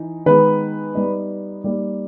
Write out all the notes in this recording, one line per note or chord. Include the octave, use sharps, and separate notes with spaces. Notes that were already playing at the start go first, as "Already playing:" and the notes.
Already playing: E3 D#4
D#3 G#3 B3 B4
G3 B3 D#4
G3 A#3 D#4